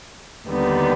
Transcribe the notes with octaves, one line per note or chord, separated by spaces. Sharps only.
D#2 D3 G3 B3 D#4